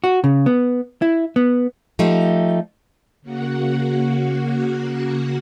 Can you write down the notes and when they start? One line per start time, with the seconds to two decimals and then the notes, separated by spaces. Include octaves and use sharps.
0.04 F#4
0.24 C#3
0.46 B3
1.02 E4
1.36 B3
1.99 F3 A3 D#4 G4
3.22 C#3 A#3 F#4 F#5